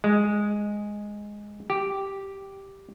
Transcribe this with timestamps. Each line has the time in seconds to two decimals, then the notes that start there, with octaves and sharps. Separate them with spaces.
0.04 G#3
1.70 G4